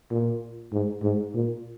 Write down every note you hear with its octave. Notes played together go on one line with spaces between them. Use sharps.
A#2
G#2
G#2
A#2